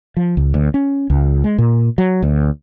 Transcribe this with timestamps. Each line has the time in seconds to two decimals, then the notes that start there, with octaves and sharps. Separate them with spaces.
0.17 F3
0.37 C#2
0.54 D2
0.74 C#4
1.10 C#2
1.44 G#3
1.58 A#2
1.98 F#3
2.23 D2